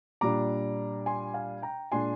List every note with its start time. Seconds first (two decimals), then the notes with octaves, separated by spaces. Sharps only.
0.21 A#2 G3 D4 A#5 D6
1.06 G#5 C6
1.34 F5 G#5
1.62 G5 A#5
1.92 A#2 G#3 D4 G#5 C6